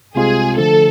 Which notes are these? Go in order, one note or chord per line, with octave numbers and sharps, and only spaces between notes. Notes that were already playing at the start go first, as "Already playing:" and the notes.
C2 C3 G#3 C4 F4 G#4
D3 F3 A3 A4